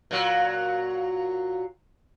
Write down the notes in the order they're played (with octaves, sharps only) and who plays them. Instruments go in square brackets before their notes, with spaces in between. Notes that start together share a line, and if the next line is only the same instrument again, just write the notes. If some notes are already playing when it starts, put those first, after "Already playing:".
[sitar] A#2 F#3